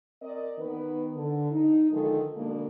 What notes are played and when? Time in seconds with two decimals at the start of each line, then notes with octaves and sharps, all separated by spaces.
0.22 C4 A#4 D5 D#5
0.59 D#3 B3 B4
1.16 D3
1.52 D#4
1.92 D3 D#3 F3 G#3 A4
2.36 B2 D3 G#3 A#3 D4